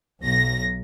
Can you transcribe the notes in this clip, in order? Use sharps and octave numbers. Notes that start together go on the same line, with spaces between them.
B1 A#6